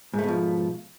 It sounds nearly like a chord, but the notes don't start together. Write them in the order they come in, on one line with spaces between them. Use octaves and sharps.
G#2 A3 B2 F3